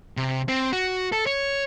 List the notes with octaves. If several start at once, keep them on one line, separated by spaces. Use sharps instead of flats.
C3
C4
F#4
A4
C#5